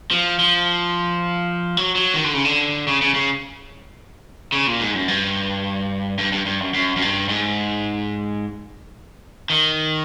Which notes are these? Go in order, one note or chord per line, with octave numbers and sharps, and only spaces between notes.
F3
F3
F#3
F#3
D#3
D3
C#3
D3
C#3
C#3
C#3
C#3
A#2
G#2
F#2
G2
G2
G2
G2
F#2
F#2
F#2
G2
G#2
D#3